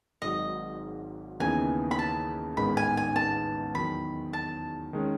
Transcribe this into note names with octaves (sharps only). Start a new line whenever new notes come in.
G#1 G#2 F#3 D#5
D#2 C#3 E3 B3 D#4 G#5
B5
A5
A1 G#2 D#3 G#3 B3 B5
G#5
G#5
A5
E2 D#3 F#3 B5
A5
D#3 G#3 C#4